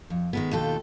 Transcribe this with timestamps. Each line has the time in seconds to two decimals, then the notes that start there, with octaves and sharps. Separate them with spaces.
0.10 F2
0.33 D#3 G#3 B3
0.51 D#2 B2 F4 A4 G5